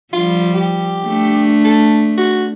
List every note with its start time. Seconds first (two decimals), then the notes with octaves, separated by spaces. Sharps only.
0.13 F3 G3 F4
0.54 G4
1.07 A3 D4
1.64 A4
2.18 F#4